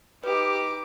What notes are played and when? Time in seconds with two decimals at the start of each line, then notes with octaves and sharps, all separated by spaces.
0.24 D#4 G4 B4 D6